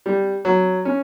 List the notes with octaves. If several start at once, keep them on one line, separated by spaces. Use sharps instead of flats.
G3
F#3
C#4